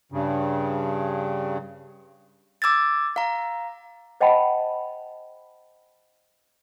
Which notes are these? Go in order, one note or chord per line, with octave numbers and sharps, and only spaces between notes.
G2 C#3
D6 E6 G#6 A6
F5 A#5
C5 D#5 F#5 G5 A5 B5